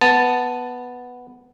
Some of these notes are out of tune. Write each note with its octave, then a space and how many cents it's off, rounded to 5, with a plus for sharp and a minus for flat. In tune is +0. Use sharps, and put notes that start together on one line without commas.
B3 +0 A5 +0